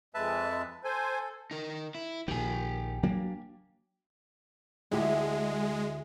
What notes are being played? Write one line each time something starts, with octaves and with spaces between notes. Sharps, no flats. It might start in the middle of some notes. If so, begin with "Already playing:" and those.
F2 G#3 B4 E5 A5
A4 C5 G#5
D#4 A#4
E4
A#1 D#3 G4 G#5
F#3 A#3 D4
D2 G#3 E4 G4